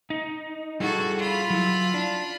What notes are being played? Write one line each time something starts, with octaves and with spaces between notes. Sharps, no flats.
D#4
G3 E4 F#4 G#4 A4
F4 B5
F#3 E4
D4